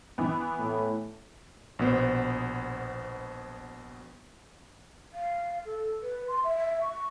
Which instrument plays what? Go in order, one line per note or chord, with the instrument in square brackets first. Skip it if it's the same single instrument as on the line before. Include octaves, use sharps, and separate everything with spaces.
[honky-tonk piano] E3 B3
[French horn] A2
[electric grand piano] A#1 B2 B3 C5
[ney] F5
A4
B4
C6
E5
E5
C#6